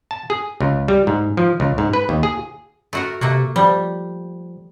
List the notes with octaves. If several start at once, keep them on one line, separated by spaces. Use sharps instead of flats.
A5
G#4
C#2
G3
G#2
F3
C#2
G#2
B4
D#2
G#4
A3 F#4 A#4
C3 A3 A#3 F#4
F3 G3